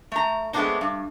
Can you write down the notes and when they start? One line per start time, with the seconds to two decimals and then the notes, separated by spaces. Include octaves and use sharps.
0.12 A3 A#5
0.53 G#3 A3 B3 C4 D4 D#4
0.81 G2